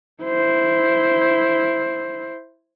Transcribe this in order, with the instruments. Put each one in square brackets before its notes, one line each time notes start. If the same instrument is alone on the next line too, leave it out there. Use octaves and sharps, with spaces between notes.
[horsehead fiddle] E4 C5